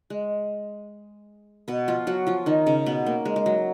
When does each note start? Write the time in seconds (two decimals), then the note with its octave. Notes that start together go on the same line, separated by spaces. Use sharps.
0.10 G#3
1.68 B2 B3
1.88 F3 F4
2.07 F#3 F#4
2.27 F3 F4
2.46 D#3 D#4
2.66 C#3 C#4
2.86 B2 B3
3.06 A#3
3.25 G#3
3.36 G#3
3.46 F#3